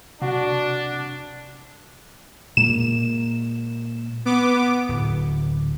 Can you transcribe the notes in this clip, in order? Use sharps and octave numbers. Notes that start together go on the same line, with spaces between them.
C3 D4 F#4
A#2 G#3 A#3 E7
B3 D6
D1